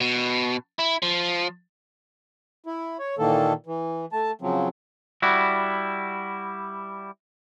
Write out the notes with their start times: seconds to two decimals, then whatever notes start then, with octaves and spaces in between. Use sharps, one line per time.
0.01 B2
0.79 E4
1.03 F3
2.66 E4
2.99 C#5
3.18 A#2 D#3 E3 A#3 A4
3.66 E3
4.13 A3 A5
4.41 C#3 F3 F#3 C4
5.22 G3 E4 F#4